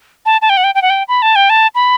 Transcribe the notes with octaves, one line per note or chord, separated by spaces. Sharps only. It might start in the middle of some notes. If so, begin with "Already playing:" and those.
A5
A5
G5
F#5
G5
G5
F#5
G5
B5
A5
G5
A5
B5